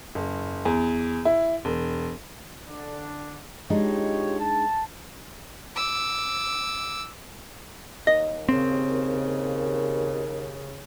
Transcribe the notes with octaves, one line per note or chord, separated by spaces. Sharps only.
F#1
E2
E4
E1
D3 D4
G#3 D4 D#4 F4 G4 C#5
A5
D6 E6
D#2 D#5
C#3 C4